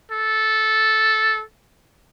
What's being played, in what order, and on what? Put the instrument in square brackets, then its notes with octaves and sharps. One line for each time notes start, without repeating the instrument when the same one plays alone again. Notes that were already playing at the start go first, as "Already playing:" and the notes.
[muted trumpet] A4